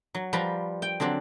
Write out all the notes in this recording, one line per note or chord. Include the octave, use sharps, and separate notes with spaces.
F#3
F3 G3 B4 A#5 B5
G5
D3 F#3 C4 D4